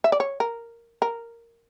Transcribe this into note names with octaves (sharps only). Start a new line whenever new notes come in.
E5
D5
C#5
A#4
A#4